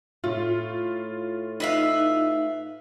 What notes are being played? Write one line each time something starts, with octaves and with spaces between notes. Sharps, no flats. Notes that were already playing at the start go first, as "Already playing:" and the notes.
A2 F4
D#4 B4 E5 F5